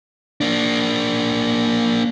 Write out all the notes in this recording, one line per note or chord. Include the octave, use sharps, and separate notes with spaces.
A#3 D4